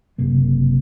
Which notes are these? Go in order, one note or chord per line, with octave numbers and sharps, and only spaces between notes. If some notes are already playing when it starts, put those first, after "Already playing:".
F#1 C3 A#3